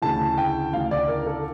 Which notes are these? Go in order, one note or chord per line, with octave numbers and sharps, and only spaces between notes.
D2 C#3 E3 A5
G5
D2 C#3 E3 F5
D5
A#4
A4